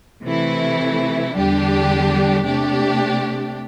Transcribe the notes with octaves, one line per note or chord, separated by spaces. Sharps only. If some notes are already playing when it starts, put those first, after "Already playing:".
C3 E3 A3 E4
E2 D3 G3 D4 G4
C3 A3 D4 G4